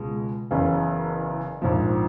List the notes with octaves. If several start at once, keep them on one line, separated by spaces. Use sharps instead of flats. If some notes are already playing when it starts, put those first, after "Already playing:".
Already playing: C#2 B2 G#3
F#1 E2 C#3
A#1 G#2 F3